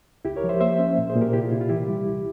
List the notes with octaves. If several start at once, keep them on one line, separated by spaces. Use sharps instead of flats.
C#2 E4 G4
A#4 C#5
F3
C5 E5
A#3 C5 E5
C#4
A#2
G#4 C5
A#2
G4 A#4
C3 E4 G4
F4
C3 E4
F4
E3 E4 G4
G3
C2